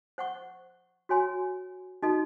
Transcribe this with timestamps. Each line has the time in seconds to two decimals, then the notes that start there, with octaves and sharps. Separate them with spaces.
0.18 C5 F#5 C#6
1.09 F#4 C#5 G#5 C6
2.03 D#4 F#4 A4 D#5